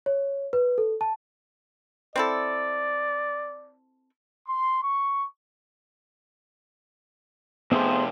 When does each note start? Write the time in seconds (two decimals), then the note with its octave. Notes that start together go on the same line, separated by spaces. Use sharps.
0.06 C#5
0.53 B4
0.78 A4
1.01 A5
2.16 C4 E4 A4 D5
4.47 C6
4.81 C#6
7.72 F2 C3 B3 G#4 C5